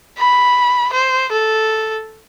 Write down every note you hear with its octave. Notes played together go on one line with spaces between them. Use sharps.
B5
C5
A4